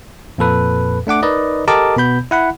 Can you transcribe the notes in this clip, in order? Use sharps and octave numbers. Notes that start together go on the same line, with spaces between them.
F2 A#2 A4 B4
A3 D4 F#5 D6
D#4 A#4 B4 D5 D#5
G4 A4 A#4 D#5 A5 D6
B2 B3 B5 G6
E4 F#5 B5